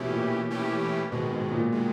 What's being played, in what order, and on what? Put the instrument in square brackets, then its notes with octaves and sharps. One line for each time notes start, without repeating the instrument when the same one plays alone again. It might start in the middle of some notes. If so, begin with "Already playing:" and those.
Already playing: [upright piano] B2 [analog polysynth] E3 A3 C#4 E4 G4
[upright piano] A#2
[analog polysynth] E3 A3 C#4 E4 G4
[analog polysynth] G#2 D#3 G#3 [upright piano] B2
[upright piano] B2
A#2
[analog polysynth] D#3 G#3